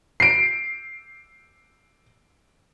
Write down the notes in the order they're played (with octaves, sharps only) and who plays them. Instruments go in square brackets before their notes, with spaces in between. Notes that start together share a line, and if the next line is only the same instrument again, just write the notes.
[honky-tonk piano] C7 D7